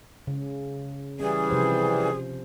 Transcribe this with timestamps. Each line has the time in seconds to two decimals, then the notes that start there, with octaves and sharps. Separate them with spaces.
0.27 C#3
1.20 E3 G3 C#4 G#4
1.50 C3 F3 C5